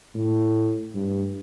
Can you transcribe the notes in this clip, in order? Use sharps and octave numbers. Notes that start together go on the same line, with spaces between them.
A2
G2